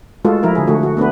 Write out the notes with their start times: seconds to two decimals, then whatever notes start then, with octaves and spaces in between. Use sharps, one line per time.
0.25 G#3 A3 F4 F#4 A4
0.43 F3 E4 F#4 A#4
0.55 D3 G#4
0.67 D3 A3 F#4
0.83 F#4
0.97 A3 B3 D4 B4